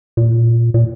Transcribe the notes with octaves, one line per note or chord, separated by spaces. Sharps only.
A#2
A#2